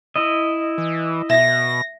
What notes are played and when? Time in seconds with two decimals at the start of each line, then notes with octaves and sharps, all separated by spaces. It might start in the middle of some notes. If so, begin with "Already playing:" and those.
0.16 E4 D#5
0.78 E3
1.30 B2 E5 A#6